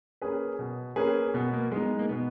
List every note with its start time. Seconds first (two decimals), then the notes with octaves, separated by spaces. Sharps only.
0.22 A#3 C#4 G#4 B4
0.59 B2
0.96 A#3 C#4 G#4 B4
1.34 B2 B3
1.54 A#3
1.71 G#3 B3 D#4
1.99 A#3
2.09 B2 B3